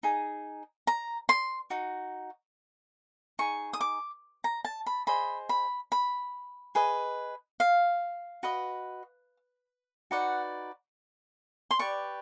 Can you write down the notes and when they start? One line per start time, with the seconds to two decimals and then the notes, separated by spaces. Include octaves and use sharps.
0.03 D#4 G#4
0.87 A#5
1.29 C6
1.70 D#4 F#4
3.39 D#4 G#4 C#6
3.73 D#6
3.81 D6
4.44 A#5
4.65 A5
4.86 B5
5.07 G#4 C5 D#5 B5
5.49 B5
5.92 B5
6.75 G#4 B4 D#5
7.60 F5
8.43 F#4 B4 D#5
10.11 D#4 F#4 B4 D5 F#5
11.71 C6
11.79 G4 B4 D5 C#6